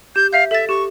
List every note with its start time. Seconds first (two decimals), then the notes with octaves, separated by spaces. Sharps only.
0.16 G4 G6
0.33 E5 F5 G6
0.51 A4 E5 A6
0.69 G4 C#6